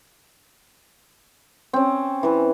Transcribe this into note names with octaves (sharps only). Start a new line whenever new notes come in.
C4 C#4
E3 B4